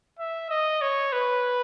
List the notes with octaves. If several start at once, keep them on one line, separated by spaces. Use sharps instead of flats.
E5
D#5
C#5
B4